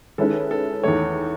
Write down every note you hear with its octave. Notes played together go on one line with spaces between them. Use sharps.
D#3 G#3 C#4 E4 A4 B4
A4
E2 D#3 A3 C#5